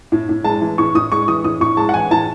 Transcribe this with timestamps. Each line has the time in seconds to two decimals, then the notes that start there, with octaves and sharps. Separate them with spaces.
0.12 A2
0.29 A2
0.44 G#3 A5
0.61 E3
0.78 A2 C#6
0.95 A2 D#6
1.11 G#3 C#6
1.28 E3 D#6
1.44 A2 D#6
1.61 A2 C#6
1.77 G#3 A5
1.89 F#5
1.94 E3 G#5
2.11 A2 A5